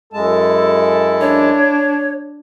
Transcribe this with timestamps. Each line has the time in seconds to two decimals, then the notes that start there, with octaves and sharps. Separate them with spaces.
0.13 F#2 G#3 E4 A4 A5
1.21 D4 C#5